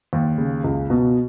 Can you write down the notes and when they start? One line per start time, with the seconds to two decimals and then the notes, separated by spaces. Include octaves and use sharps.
0.13 D#2
0.38 C#3
0.64 C#2
0.90 B2